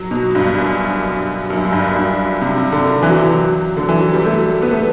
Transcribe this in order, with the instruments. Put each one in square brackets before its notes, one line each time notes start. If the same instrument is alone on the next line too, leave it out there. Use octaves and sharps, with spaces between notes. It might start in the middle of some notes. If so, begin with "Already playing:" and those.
Already playing: [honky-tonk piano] F#3
B2
G2
F#2
F#2
G2
F#2
G2
G2
C3
D3
E3
F#3
E3
F#3
D3
E3
F#3
G3
A3
B3
A3